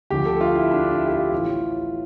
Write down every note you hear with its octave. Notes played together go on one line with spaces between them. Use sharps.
D2 D3 F3 G4
A4
F4
E4
D4
E4
G4
F4
A1 A2 E3